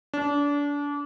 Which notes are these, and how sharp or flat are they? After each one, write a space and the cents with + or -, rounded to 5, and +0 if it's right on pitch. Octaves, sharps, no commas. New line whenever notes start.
D4 -30